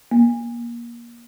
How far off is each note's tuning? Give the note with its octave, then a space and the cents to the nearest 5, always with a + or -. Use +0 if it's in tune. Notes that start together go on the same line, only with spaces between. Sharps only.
A#3 +20